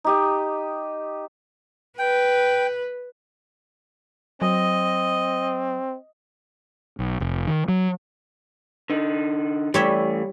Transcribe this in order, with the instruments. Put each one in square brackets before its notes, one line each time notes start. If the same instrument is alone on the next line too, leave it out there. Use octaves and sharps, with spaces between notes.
[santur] D#4 G4 D#5
[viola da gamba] B4 [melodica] G5
[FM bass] F#3 [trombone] C4 [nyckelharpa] D#5
[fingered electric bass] B1
F1
D#3
F#3
[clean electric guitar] D3 D#4
[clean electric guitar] E3 A3 [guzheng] G3 C#5 E5